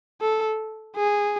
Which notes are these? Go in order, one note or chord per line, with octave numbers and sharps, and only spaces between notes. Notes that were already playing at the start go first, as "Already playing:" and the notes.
A4
G#4